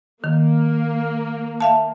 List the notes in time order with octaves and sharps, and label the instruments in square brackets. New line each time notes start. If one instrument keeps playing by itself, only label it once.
[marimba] D#3 [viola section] A#3
[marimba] E5 F5 A5